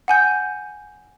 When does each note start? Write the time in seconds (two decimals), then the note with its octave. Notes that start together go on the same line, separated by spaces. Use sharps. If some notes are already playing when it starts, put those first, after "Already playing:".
0.08 F#5 G#5 G6